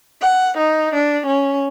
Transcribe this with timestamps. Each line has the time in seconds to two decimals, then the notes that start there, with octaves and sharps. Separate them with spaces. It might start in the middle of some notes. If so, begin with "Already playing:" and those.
0.22 F#5
0.57 D#4
0.94 D4
1.26 C#4